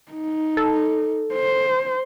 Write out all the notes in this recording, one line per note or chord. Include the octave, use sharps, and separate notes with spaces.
D#4
A4
C5